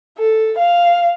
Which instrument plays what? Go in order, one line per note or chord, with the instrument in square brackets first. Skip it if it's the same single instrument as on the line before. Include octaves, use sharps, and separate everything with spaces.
[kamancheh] A4
F5